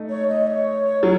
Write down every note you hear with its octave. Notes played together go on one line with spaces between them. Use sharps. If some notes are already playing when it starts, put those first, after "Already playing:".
Already playing: A3 D#4
C#5
D#5
C#5
F#3